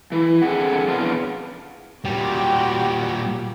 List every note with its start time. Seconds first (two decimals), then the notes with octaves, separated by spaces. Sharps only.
0.12 E3
0.42 F2 D3 D#3 C4 G#4 F#5
0.89 E2 B2 B3 C#4 D4 F4
2.05 A#2 G3 F#4 G4 G5